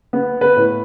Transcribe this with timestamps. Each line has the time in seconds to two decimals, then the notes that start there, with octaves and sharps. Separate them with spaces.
0.13 B3
0.41 B4
0.56 A2